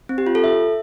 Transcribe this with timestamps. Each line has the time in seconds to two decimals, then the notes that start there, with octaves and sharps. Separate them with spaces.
0.09 C4
0.18 G4
0.26 F4
0.35 A4
0.44 E5